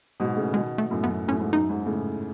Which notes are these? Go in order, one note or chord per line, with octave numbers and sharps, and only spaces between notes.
G#2 B2
A2 C#3
B2 D#3 G#3
A3
F#2 A2
F#2 B3
F#2 A2 C#4
G#2
F#2 D#4
G#2
A2 C#3